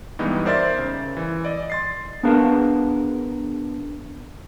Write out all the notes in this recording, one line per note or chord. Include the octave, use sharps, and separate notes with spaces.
G2 E3 G3 G#3 B3 D#4
A#4 C5 D5 E5 C6 A6
C#3
E3
D5 D#5
C6 A6 C7
B3 D4 G#4 A#4 B4 F5